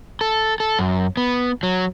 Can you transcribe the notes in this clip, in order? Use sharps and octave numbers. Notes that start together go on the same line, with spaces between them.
A4
A4
F#2
B3
F#3